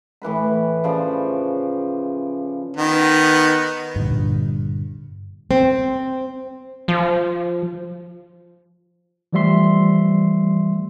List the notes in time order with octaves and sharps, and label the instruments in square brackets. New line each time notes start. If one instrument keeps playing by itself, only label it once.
[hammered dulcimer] A2 E3 B4 B5
C#3 F3 D5
[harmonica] D#3 B3
[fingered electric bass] G2 A#2 D3 G3
[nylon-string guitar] C4
[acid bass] F3
[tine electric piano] E3 F3 G3 A3 E5 C6